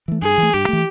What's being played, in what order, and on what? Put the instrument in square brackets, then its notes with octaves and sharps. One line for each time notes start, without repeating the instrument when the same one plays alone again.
[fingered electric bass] E3 A3
[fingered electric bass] G2 [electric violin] G#4
[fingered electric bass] E3
A3
[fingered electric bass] G2 [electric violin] G4
[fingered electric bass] E3 A3